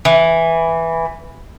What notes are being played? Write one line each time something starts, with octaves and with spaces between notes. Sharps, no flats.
E3